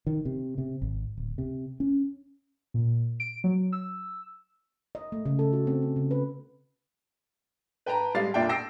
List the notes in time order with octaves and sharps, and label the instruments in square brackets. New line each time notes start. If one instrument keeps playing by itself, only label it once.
[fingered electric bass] D#3
C3
C3
G#1
D1
C3
C#4
[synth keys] A#2
D7
F#3
E6
[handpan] D#5
A3
C#3
A4
F#4
C4
C#4
C#3
B4
[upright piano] B4 G5 A5 A#5
G3 G#3 F5 A6 C7
F1 A#2 D4 E5 G5
G5 E6 A#6 C7 D7